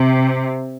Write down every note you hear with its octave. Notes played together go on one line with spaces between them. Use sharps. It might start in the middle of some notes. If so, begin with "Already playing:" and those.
Already playing: C3